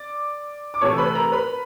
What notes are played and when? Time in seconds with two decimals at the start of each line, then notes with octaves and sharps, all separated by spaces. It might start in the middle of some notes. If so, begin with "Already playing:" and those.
Already playing: D5 D6
0.74 D6
0.81 C3 E3 A3 C#5 C#6
0.98 B4 B5
1.15 A#4 A#5
1.32 B4 B5